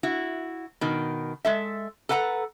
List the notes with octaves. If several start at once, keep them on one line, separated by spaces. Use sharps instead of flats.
E4 F#4
B2 D#3
G#3 A4 E5
A4 B4 F#5 G#5 A#5